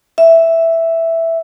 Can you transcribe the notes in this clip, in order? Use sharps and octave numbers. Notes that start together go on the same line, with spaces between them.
E5